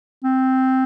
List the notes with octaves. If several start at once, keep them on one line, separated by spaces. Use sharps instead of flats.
C4